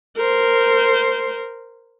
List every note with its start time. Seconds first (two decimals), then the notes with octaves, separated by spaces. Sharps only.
0.17 A#4 C5